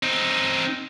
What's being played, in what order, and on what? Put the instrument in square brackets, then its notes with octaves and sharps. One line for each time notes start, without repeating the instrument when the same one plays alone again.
[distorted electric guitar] C4 D#4